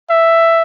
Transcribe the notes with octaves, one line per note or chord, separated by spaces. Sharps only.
E5